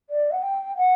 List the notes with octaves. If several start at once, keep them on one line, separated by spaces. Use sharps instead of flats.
D5
F#5
G5
F#5